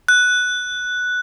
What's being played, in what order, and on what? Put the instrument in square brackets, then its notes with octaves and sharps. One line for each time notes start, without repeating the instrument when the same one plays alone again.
[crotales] F#6